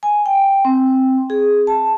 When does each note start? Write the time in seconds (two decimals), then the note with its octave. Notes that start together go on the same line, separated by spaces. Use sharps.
0.03 G#5
0.26 G5
0.65 C4
1.30 G#4
1.67 A5